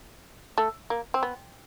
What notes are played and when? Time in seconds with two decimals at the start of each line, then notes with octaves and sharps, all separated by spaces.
0.58 A3
0.90 A#3
1.14 C4
1.23 B3